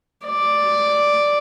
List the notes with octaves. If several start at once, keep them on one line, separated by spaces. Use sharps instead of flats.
D5